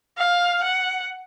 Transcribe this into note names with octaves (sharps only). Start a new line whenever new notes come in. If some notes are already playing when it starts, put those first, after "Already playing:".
F5
F#5